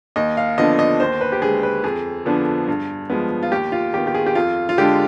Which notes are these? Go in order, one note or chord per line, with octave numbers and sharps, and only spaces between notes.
D#2 D#5
F5
D3 F3 B3 D4 D#5
D#5
D#2 C5
B4
G4
D3 G#3 G#4
B4
F2 G#4
D3 F3 B3 D4
G2
F3 G#3 B3
F4
D#2 G4
F4
D#3 B3 G4
G4
G#4
G4
F2 F4
F4
D3 G#3 D4 G4